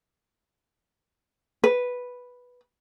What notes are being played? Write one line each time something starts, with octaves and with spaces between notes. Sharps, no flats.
B4